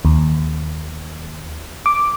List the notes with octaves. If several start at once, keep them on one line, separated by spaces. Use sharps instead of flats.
D#2
D6